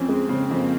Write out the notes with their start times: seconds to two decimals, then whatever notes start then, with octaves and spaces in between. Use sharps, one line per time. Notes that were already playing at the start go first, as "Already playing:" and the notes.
Already playing: F2 C4 C#4
0.08 G#3
0.29 C#3 A#3
0.51 F2